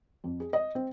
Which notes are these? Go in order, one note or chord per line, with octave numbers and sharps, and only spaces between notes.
F2
G#4
D#5
C4